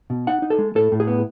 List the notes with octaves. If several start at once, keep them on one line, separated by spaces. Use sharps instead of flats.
B2
D#4 F#5
D#4
A4
G#3
A2 A4
A2
G#4
B3